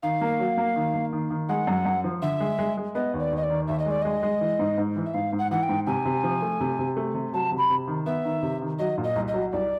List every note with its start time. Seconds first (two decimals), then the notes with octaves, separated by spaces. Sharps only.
0.03 D#3 F5
0.21 A#3
0.40 F#3
0.58 A#3
0.76 D#3
0.94 A#3
1.13 D#3
1.30 D#3
1.49 G#3 F#5
1.67 F#2
1.86 F#2
2.04 F3
2.22 D3 E5
2.40 G#3
2.59 G#3
2.77 G#3
2.95 B3 D#5
3.14 D#2
3.19 D5
3.32 D#2
3.37 D#5
3.43 D5
3.50 D#3
3.68 D#2 E5
3.79 D#5
3.86 G#3 D5
4.02 G#3 D#5
4.23 G#3
4.41 E3
4.59 G#2
4.78 G#2
4.96 E3
5.06 E5
5.14 G#2 F5
5.33 G#2
5.39 F#5
5.51 E3 F#5
5.63 G5
5.69 G#2
5.87 C3 G#5
6.05 C3
6.23 F3
6.42 A3
6.61 C3
6.79 C3
6.97 A3
7.14 C3
7.33 F#3 A5
7.51 C3
7.58 B5
7.70 C3
7.87 D#3
8.06 B3 E5
8.25 D#3
8.43 C3
8.62 D#3
8.79 F#3 D#5
8.98 A#2
9.04 D#5
9.16 C2
9.28 D#5
9.34 F#3
9.52 C2 D5